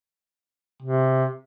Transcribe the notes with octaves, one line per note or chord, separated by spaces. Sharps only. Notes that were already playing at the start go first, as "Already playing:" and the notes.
C3